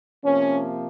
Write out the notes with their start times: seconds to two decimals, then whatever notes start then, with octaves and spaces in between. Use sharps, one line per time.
0.23 C3 F3 A#3 C#4